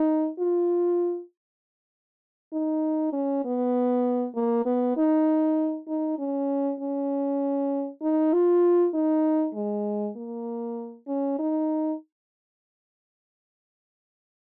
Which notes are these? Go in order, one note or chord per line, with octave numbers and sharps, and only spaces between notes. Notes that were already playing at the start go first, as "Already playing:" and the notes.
Already playing: D#4
F4
D#4
C#4
B3
A#3
B3
D#4
D#4
C#4
C#4
D#4
F4
D#4
G#3
A#3
C#4
D#4